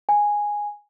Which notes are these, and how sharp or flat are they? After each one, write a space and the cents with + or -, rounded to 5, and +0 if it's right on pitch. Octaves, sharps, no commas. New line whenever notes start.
G#5 -5